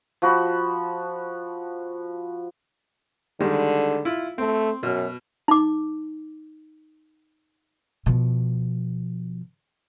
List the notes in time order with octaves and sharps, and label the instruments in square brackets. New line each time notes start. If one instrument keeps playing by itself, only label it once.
[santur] F3 F#4 B5
[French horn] D3 [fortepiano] D#3 G3 G#3
[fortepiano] E4 F4
[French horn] A3 [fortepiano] C4
[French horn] F#2 [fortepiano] B2 F6
[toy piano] D#4 D6
[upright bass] B2 F3